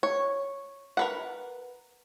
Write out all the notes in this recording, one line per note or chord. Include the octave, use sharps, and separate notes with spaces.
C#5
A#4 B4 F#5